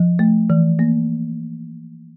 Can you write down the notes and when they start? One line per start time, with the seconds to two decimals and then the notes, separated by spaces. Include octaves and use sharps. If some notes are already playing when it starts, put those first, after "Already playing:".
Already playing: F3
0.19 A3
0.50 E3
0.79 A#3